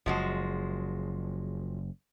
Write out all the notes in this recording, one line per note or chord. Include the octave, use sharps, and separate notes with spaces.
F#1 F3 G#3 F#4